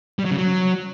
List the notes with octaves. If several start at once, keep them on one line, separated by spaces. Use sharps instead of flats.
G3
F#3
C#3
F#3